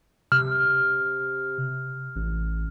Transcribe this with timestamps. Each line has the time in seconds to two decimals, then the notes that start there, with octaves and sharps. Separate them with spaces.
0.32 C3 F6
2.16 A1